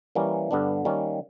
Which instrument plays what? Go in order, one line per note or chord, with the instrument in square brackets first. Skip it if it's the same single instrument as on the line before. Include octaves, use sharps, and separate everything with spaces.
[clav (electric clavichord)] E3 G3 A#3 C#4
G2 D3 G3 B3 D4
D#3 G3 A#3 C#4